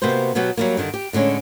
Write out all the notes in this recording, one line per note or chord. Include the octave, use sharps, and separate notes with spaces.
C3 A#3 B3 F#4 C5
B2 F#3 B3 F#4 G4
F#3 G3 A#3
G2 D3 D#3
G4
A2 D3 G#3 C#4